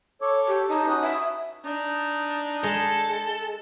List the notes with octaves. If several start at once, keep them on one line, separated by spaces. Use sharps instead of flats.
A4 C#5 D6
G4
D#4 A5
C#4 F#4 B4 D#6
E5
D4 D#4
G#3 A4